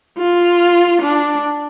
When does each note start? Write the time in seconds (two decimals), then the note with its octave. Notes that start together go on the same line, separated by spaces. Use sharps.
0.18 F4
1.02 D4